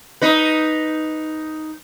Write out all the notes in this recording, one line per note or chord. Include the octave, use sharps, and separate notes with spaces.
D#4 B4